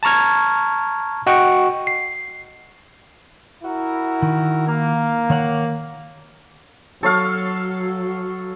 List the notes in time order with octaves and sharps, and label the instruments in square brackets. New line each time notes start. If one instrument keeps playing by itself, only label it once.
[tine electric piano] A5 A#5 C#6 F6 G#6
F#4 D#5 F#5 G5 C#6
C7
[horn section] E4 F#4 A#4
[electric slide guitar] D#3
[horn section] A#3
[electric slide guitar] D#3 C#5 F#5
[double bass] F#3 [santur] A4 C#5 F5